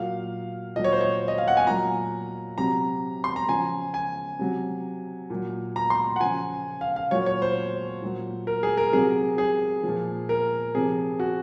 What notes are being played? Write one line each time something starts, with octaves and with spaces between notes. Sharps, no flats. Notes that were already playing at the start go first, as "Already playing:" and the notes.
Already playing: A#2 F#3 F5
A#2 F#3 D#5
C#5
C5
C#5
D#5
F5
F#5
G#5
A#2 F#3 A#5
C3 F#3 A#5
C6
A#5
C#3 F3 G#5
G#5
C3 F#3
A#2 F#3
A#5
C6
F#5
C#3 F3 G#5
F5
F5
A#2 F#3 C#5
C#5
C5
A#2 F#3
A#4
G#4
A#4
C3 F#3 G#4
G#4
A#2 F3
A#4
C3 F3 G#4
F#4